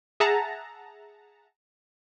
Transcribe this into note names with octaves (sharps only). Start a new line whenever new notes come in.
G#4 E5 F#5 A5 A#5